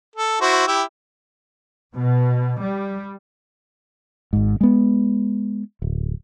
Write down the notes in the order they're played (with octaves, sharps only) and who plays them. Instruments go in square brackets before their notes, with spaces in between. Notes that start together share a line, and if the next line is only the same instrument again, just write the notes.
[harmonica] A4
E4 F#4 C5
E4 G4 E5
[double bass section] B2
G3
[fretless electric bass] G#1 G#2
G#3 B3
D1